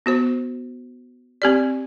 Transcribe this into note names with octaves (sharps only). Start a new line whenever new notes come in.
B3 F#4 C5
C4 G4 D5